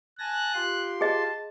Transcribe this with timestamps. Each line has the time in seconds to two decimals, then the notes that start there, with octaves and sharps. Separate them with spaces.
0.19 G#5 A5 F#6 A#6
0.54 F4 G4 C6
1.01 G#4 D#5 A5